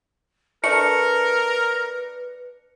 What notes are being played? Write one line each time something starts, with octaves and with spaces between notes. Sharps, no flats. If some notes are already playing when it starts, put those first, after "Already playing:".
A3 D4 A#4 B4 C#7